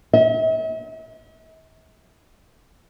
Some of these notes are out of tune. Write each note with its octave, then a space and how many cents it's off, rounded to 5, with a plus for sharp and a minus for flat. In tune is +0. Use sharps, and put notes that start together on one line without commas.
E5 -45